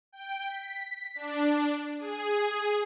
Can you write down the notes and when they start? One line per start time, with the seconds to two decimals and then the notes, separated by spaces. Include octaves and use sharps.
0.12 G5
0.47 B6
1.15 D4
1.99 G#4